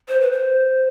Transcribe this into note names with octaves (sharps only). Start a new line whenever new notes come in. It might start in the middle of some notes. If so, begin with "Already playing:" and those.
C5
B4
C5